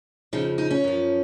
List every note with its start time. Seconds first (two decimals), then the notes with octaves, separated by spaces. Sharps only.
0.33 F2 C#3 F3 D#4
0.58 D#4
0.71 C#4
0.84 F#2 F3